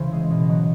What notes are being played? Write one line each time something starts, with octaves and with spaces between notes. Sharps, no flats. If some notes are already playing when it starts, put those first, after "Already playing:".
Already playing: C#3 E3 C5
G#3
B2
F#3